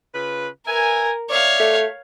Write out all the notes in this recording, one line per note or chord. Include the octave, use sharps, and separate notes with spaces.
C#3 F4 B4
A#4 B4 E5 G#5
C#5 D5 E5 F5
A3